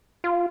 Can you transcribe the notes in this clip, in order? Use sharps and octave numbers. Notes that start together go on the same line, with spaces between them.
F4